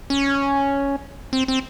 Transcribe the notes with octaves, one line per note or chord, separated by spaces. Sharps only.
C#4
C4
C4